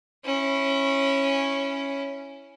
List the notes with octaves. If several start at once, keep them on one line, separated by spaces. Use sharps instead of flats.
C#4 E4